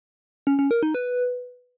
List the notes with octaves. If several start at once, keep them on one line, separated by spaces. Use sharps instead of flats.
C#4
C#4
A#4
D#4
B4